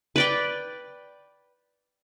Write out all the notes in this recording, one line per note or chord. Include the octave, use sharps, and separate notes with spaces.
B4 D5 G5